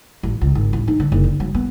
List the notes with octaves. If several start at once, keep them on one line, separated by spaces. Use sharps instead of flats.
A1
C#2
G#1
A1
D#4
D3
F#1
D3
F#3
B3